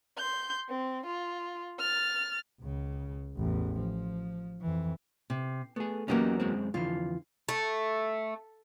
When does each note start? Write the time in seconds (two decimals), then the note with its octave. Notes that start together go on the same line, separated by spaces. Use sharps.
0.17 C6 G6
0.69 C4
1.06 F4
1.79 F6 A6
2.61 C#2 C#3
3.37 A1 E2
3.78 F3
4.62 F2 E3
5.30 C3
5.76 A3 B3 G#4
6.08 E2 F#3 A#3 C#4 D#4 G4
6.40 F#2 G#3 C4
6.74 F2 D3 E3 F4
7.49 A3